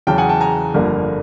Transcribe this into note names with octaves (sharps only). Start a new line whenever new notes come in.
E2 C#3 F#3 G5 A5
F#5 G#5
G5 A5
G#5 A#5
G1 F2 D3 G3 A#3